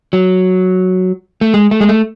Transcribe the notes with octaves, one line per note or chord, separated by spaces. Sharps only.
F#3
A3
G#3
A3
G#3
A3